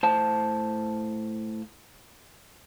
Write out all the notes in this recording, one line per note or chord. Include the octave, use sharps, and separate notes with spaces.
A2 C5 F5 A5